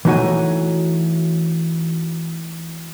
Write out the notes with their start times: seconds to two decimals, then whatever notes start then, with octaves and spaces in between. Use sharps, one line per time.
0.05 E3 A3 D#4 F#4 C#5 G#5